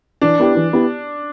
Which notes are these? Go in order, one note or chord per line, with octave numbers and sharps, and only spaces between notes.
E3 D4
B3 E4 G4
E3
B3 E4 G4